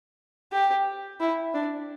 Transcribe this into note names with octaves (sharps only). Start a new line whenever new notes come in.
G4
E4
D4